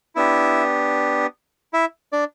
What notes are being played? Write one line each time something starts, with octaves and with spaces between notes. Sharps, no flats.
B3 D4 E4 G4 E5
E4 E5
D4 D5